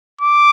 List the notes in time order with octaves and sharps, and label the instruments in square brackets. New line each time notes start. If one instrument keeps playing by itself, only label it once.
[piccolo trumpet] D6